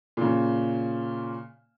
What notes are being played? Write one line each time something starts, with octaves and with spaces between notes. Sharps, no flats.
A#2 C#3